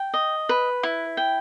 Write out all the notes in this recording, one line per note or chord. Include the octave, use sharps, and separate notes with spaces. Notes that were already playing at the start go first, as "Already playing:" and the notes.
Already playing: G5
D#5
B4
E4
G5